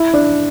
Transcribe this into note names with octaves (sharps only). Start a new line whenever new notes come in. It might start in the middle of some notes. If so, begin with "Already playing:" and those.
Already playing: E4
D4